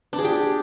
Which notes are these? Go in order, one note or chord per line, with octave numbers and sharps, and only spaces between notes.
D4
G#4
G4